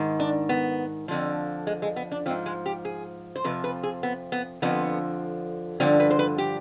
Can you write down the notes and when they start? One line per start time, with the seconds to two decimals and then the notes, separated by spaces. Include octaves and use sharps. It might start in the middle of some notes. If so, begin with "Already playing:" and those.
Already playing: G#2 D#3
0.20 D4
0.49 B3
1.08 F2 D3 F3
1.67 G#3
1.82 G#3
1.96 B3
2.12 D4
2.26 F3 C4
2.29 G#2
2.46 G#3
2.66 G4
2.85 G#4
3.36 C5
3.44 F2 C3 F3 B4
3.64 B4
3.83 G#4
4.03 B3
4.32 B3
4.62 F2 D3 F3 B3
5.80 G2 D3 F3 C4
6.00 B4
6.11 C5
6.19 B4
6.38 G4